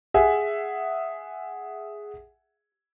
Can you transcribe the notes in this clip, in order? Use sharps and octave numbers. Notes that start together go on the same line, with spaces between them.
G#4 E5 F#5 G#5